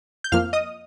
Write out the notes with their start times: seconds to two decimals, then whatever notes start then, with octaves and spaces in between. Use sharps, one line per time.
0.24 G6
0.32 F2 F3 A#3 F5 F6
0.53 D#5 D#6